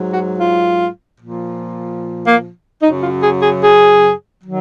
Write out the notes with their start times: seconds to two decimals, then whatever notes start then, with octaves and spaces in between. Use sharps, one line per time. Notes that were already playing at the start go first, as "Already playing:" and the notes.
Already playing: G#2 F#3
0.13 F#4
0.40 F4
1.20 A#2 F3
2.27 A#3
2.82 F#2 C#3 F#3 D#4
3.03 F4
3.23 G#4
3.43 G#4
3.63 G#4
4.44 D#3 F#3